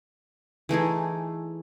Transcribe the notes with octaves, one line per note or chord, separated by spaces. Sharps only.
E3 A3 D#4 G#4